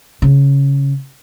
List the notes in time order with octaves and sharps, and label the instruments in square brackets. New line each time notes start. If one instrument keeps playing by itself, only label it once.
[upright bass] C#3